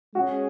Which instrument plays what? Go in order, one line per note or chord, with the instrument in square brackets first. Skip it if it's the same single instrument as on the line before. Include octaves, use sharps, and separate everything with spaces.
[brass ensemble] G#3 C#4 G#4 [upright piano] F#4